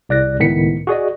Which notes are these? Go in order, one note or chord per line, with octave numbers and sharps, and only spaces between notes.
C2 D5 F#6 A#6
C#2 A2 D#3 B3 B6 C#7
F#4 G#4 D5 D#5